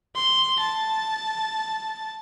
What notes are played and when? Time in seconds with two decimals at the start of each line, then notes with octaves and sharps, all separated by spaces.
0.15 C6
0.60 A5